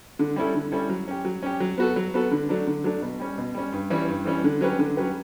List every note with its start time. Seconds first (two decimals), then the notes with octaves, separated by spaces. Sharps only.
0.19 D3
0.36 G3 C#4 E4 A4
0.55 D3
0.72 G3 C#4 E4 A4
0.89 F#3
1.08 C#4 G4
1.25 F#3
1.43 C#4 G4
1.60 F#3
1.78 B3 F#4 A4
1.96 F#3
2.14 B3 F#4 A4
2.31 D3
2.49 F#3 A3 D4
2.67 D3
2.84 F#3 A3 D4
3.02 B2
3.20 G3 C#4
3.38 B2
3.55 G3 C#4
3.72 G2
3.90 E3 G3 C#4
4.08 G2
4.25 E3 G3 C#4
4.44 D3
4.61 F#3 C#4 G4 B4
4.79 D3
4.97 F#3 C#4 G4 B4